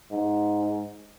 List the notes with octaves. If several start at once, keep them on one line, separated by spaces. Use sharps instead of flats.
G#2